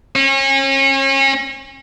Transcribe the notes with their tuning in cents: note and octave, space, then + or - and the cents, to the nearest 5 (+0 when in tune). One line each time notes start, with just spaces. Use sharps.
C#4 -35